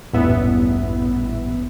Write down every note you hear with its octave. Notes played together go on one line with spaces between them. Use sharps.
A1 E2 G2 A#2 B3 E5